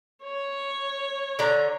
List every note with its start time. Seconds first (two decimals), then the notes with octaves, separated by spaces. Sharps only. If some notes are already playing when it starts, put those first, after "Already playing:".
0.23 C#5
1.39 D3 A#5